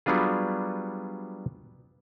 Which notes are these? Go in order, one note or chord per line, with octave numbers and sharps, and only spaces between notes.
F#3 G3 B3 D4 F4 G#4